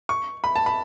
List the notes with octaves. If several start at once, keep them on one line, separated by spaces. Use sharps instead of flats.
C#6
B5
A5
B5